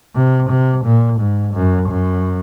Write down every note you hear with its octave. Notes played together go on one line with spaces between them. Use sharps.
C3
C3
A#2
G#2
F#2
F#2